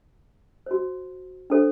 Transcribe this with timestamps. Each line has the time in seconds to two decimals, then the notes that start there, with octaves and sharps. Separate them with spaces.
0.66 F#4 C5
1.50 D4 A4 C5